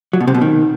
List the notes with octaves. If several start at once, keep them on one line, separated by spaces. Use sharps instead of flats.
F#3
B2
C3
B2
D#3